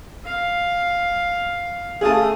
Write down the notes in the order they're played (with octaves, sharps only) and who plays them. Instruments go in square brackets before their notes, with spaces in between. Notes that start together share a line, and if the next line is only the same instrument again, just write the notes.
[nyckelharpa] F5
[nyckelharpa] A3 D#6 [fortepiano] G#4 F5 A5